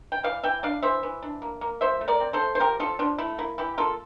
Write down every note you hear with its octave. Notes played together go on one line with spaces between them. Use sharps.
G5
E3 D5 F5
E3 E5 G5
D4 D5 F5
E3 C5 E5
E3
D4
A#3
A#3
F3 C5 E5
A3
A#4 D5
C4
A4 C5
A3
C5
F3 G4 A#4
F3 F4 A4
F3 D4 F4
A3 E4
A#3 E4
E3 E4 G4
A#3 F4 A4